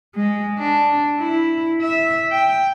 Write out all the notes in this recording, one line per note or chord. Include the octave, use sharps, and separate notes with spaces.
G#3
D4
E4
E5
G5